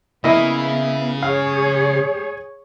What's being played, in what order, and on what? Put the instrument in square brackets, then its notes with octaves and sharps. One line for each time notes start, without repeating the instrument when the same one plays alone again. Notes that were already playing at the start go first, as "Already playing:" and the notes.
[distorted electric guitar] C#3 [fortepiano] A#3 E4 D#5 [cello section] B3
[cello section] G#4 C#5 [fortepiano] F5